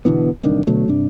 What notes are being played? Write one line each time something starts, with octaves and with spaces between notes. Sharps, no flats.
B2 D3 E3 B3
D1 C2 D#3 D4
B2 D3 F#3 A3
G2 C3 D4